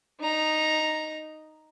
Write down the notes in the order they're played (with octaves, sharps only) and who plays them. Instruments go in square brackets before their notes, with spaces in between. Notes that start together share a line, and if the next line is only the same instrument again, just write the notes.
[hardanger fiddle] D#4 A#5